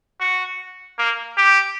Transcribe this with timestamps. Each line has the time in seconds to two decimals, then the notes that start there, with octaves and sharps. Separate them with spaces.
0.20 F#4
0.99 A#3
1.38 G4